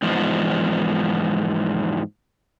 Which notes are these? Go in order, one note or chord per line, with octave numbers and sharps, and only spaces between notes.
E2 G#2 F3